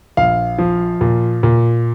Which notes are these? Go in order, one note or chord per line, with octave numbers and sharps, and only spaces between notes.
A#1 F5
F3
A#2
A#2